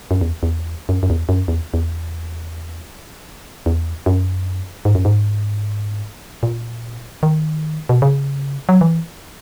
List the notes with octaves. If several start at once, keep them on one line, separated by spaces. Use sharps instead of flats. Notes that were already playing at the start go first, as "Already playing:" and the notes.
F#2
E2
E2
F#2
F#2
E2
F#2
E2
E2
E2
F#2
G#2
F#2
G#2
A#2
D#3
B2
C#3
F#3
E3